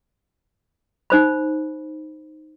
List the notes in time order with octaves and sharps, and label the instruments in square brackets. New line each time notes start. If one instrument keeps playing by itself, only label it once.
[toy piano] D#4 C5 B5